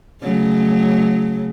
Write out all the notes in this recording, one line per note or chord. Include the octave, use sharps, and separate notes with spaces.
C#3 F#3 A3